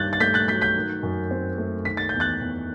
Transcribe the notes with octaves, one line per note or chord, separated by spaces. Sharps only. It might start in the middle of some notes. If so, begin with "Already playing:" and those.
Already playing: G2 D#3 F#6 G6 A6
A6
A3 G6 B6
F#6 A6
F#3 G6 B6
G6 B6
D#3
F#2
C4
A3
D#3 B6
A6
E2 G6
F#6 A6
E2